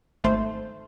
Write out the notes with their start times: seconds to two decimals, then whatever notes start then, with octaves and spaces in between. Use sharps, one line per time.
0.24 G#1 A3 C5